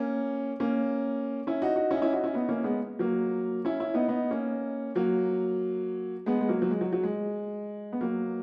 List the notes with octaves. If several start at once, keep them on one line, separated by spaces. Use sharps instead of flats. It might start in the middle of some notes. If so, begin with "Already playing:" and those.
Already playing: A#3 C#4
A#3 C#4
C#4 E4
D#4 F#4
D#4 F#4
C#4 E4
D#4
C#4 E4
D#4 F#4
C#4 E4
B3 D#4
A#3 C#4
G#3 B3
F#3 A#3
C#4 E4
C#4 E4
B3 D#4
B3 D#4
A#3 C#4
F#3 A#3
G#3 B3
G#3
F#3 A#3
F#3
G#3
F#3
F#3
G#3
B3
F#3 A#3